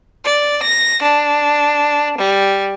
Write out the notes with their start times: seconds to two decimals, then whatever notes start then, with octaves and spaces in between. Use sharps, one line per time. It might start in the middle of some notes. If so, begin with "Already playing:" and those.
0.24 D5
0.61 A#6
1.02 D4
2.18 G3